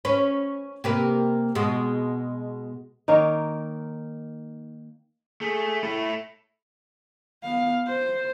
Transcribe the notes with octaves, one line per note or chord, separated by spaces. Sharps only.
C#4 B4
C3 A#3 B4
B2 G#3
D#3 A#3 D#4 C#5
A3 G#4
A2 A3 E4
B3 F5
C5